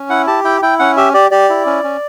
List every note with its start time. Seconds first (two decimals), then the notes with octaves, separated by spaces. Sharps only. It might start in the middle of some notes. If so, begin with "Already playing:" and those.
Already playing: C#4
0.09 E4 F#5
0.27 G4 A5
0.44 E4 G5
0.62 E4 G5
0.79 C#4 F#5
0.97 G4 E5
1.14 G4 D5
1.31 G4 D5
1.50 E4
1.66 C#4
1.84 C#4